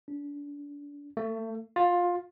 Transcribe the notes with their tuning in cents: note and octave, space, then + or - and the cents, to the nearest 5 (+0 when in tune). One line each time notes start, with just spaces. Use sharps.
D4 -30
A3 +30
F4 +15